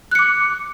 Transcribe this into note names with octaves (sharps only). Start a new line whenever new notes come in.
D6 F#6 C#7